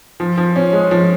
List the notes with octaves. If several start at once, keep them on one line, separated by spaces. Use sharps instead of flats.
F3
F3
C#4
G#3
F3